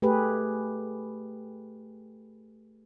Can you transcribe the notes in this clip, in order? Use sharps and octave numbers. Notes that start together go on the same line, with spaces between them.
A3 G4 G#4 B4